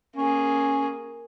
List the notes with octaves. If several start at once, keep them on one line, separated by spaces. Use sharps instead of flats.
A#3 C#4 G#4